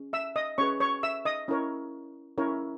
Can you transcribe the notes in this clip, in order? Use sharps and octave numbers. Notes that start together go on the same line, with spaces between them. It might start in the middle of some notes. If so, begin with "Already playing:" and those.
Already playing: C#4 G#4
E5 E6
D#5 D#6
C#4 G#4 B4 C#5 C#6
C#5 C#6
E5 E6
D#5 D#6
C#4 E4 A#4 C#5
C#4 E4 A#4 C#5